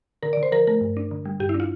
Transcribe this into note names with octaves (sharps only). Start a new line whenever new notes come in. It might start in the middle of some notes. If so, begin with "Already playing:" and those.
D3 A#4
D3 D5
C5
F3 A#4
A3 A#4
G2
D4
D3
G3
G2 G4
E4
D4
F4